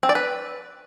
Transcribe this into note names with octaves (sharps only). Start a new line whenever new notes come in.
C4
D5
B4